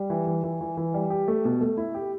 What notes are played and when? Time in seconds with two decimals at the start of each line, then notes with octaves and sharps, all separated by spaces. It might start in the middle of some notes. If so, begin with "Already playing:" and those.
Already playing: G3
0.10 E3
0.27 E3
0.44 E3
0.61 E3
0.77 E3
0.94 G3
1.10 G4
1.28 A3
1.45 B2
1.61 A3
1.77 E4
1.94 G4